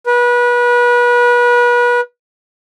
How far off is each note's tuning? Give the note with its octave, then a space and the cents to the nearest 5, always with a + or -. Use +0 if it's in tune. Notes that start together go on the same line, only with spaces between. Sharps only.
B4 -30